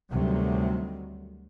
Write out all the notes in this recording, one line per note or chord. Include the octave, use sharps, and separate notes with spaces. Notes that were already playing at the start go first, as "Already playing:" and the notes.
D2 C3 D#3 F#3 G3